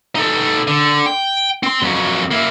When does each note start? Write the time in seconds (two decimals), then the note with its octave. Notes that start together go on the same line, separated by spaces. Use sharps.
0.15 D#4 A4
0.68 D3
1.06 G5
1.63 C4 C6
1.82 F2 F#3
2.31 A#3 E4